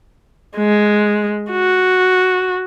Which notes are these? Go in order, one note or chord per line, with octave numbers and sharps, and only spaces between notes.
G#3
F#4